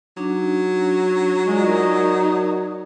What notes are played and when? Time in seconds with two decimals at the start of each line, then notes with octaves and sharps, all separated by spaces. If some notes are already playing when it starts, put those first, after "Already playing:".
0.17 F#3 D4 D#4
1.47 G#3 F4 D5
1.66 D#4 A#4 D5 C6